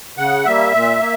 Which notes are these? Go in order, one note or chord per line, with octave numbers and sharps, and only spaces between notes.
C#3 F#5
G3 A#3 E5
A#2
A#3